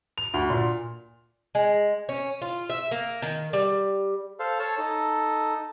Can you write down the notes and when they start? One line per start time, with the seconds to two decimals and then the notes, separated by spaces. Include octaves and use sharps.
0.18 F7
0.34 D2
0.50 A#2
1.55 G#3
2.09 C#4
2.42 F4
2.70 E5
2.91 A#3
3.22 D#3
3.53 G3
4.40 A4 C5 F5
4.59 A4 C#5 A5
4.78 D#4 A4